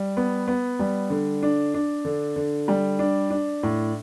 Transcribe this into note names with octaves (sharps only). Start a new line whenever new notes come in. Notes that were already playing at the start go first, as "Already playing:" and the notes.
Already playing: G3
B3
B3
G3
D3
D4
D4
D3
D3
G3
D4
D4
A2